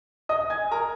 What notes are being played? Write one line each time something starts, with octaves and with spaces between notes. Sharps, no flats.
D#5 D#6
G#5 G#6
A#4 A#5